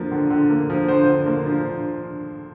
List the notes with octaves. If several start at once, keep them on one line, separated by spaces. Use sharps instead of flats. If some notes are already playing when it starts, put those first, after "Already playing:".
Already playing: D3 F3 A#3
D3
D3
A#3
F3
D3 C5
D3
A#3
F3